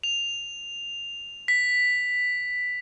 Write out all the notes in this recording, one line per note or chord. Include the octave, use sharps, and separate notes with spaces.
F7
B6